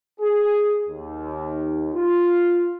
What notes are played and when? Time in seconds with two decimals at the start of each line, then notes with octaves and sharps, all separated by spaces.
0.20 G#4
0.88 D#2
1.94 F4